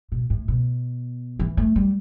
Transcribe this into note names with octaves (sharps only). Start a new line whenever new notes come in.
B2
A2
B2
E3
A3
G3